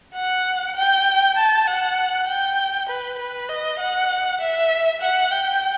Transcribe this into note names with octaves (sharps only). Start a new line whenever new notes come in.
F#5
G5
A5
F#5
G5
B4
B4
D#5
F#5
E5
F#5
G5